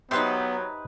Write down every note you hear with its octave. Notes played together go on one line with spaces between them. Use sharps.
F#3 B3 D#4 G4 B4 C5 E5 C6